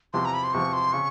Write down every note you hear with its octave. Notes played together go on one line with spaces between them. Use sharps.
E2 C3 F3 C6
A#5
B5
C6
E2 C3 F3 C#6
C6
C#3 C#6